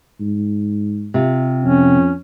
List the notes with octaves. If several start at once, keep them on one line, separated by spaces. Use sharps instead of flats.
G#2
C3 F4
F2 C#4